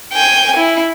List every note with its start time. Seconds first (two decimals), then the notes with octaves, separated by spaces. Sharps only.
0.14 G5 G#5
0.57 E4